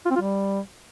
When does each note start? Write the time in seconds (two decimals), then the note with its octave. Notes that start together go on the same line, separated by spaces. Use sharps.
0.05 F4
0.11 C4
0.16 F4
0.21 G3